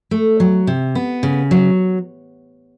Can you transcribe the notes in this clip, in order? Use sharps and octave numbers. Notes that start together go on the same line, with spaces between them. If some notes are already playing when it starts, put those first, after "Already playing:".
A3
F#3
C3
B3
C#3
F#3